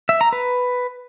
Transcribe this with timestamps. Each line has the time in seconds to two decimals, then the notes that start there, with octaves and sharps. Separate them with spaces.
0.09 E5
0.21 A#5
0.33 B4